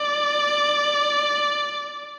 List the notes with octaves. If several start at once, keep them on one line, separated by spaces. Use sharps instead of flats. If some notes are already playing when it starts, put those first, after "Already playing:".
Already playing: D5